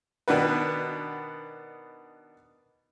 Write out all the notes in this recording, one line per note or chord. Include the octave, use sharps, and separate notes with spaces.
B2 D#3 B3 D4 F#4 B4